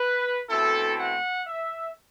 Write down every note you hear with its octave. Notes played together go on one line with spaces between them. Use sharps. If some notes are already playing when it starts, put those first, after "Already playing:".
Already playing: B4
B2 A3 C4 E4 A4
F#5
E5